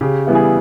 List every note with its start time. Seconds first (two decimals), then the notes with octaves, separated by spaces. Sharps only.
0.01 C#3 G4
0.27 E3 G3 B3 E4
0.35 G#4